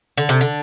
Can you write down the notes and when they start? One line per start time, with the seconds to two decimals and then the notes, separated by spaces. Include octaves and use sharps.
0.18 D3
0.29 C3
0.41 D3